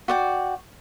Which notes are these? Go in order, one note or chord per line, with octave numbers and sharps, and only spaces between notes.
F#4 D5 G5